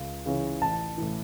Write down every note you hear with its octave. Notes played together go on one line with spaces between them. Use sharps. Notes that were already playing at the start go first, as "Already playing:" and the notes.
Already playing: C#2
C#3 E3 C#4
A1 A5
A2 E3